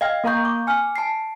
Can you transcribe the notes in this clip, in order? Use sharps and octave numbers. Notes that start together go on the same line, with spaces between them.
D#5 F5 G5 F6 G#6
A#3 A#4 F5 A#5 C#6 G6
D6
G#5 F6
A5 C7